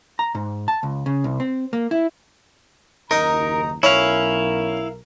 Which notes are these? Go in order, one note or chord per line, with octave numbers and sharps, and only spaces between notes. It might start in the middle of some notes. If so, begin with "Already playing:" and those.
A#5
G#2
A5
C#2
C#3
C2
C4
A#3
E4
F#1 D#2 D#4 A#4 A#5
B1 C#4 E4 A#4 F5